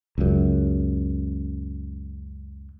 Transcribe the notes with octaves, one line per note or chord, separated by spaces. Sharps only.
C#2 F#2